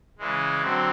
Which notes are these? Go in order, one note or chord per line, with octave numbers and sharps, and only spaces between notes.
C#3 E3 G#3
D3 F#3 C4